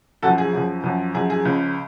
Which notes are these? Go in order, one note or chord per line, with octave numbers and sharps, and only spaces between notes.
F#2 F3 F#4 A4
G#4
F#2 F3
F#2 F3
F#2 F3 G#4
G#4
C#2 C#3 F3